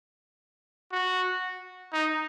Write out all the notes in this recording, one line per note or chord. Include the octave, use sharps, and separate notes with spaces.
F#4
D#4